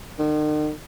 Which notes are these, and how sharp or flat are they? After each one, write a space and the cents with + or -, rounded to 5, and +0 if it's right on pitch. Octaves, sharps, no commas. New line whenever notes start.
D#3 -45